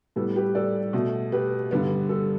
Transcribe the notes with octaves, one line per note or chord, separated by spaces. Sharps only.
A2 G3 B3 A4
G4 B4
A4 D5
B2 A3
G4 B4
G2 D3 G3 B3
A4